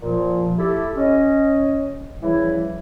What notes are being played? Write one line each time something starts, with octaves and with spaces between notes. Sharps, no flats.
A#2 F3
A3 E4 G4 A4
C#4 D#5
C#3 E3 F3 G3 E4